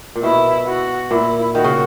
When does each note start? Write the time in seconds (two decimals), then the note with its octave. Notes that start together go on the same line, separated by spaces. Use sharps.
0.16 A#2
0.23 B2 E4
0.67 F#4
1.11 A#2 E4
1.55 D#3 F#4
1.64 C#3